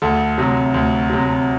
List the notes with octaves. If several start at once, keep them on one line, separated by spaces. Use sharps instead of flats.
D2 A4
C3 F#3
D2
C3 F#3